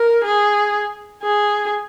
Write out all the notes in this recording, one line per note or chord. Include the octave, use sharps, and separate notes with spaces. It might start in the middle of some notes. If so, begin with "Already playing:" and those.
Already playing: A#4
G#4
G#4